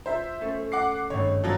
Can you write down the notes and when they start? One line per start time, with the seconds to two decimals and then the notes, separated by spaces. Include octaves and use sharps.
0.06 F4 C5 E5
0.41 A3 C#4 A4
0.72 F#5 D6 C7
1.10 G#1 G2 A3 C#5
1.44 F3 F#3 F4